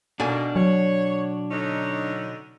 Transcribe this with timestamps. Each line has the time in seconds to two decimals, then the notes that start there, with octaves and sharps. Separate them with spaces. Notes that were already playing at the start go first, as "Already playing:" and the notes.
0.20 B2 D#3 A#3 D4 D#4 A4 G#5
0.56 F#3 C#5
1.51 D3 C#4 D#4